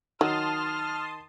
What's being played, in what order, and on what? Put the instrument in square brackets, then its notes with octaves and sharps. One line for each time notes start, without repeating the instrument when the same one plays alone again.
[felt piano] D#3 [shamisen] F#3 [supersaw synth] A5 C6 D#6 [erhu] F6